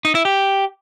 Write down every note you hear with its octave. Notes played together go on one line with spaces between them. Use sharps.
D#4
E4
G4